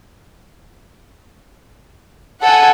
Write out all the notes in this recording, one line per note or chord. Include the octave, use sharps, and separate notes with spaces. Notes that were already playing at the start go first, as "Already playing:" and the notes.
A4 F#5 G#5